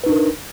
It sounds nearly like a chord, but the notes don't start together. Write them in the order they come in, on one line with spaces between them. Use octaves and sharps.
B4 D#4 D4 A#4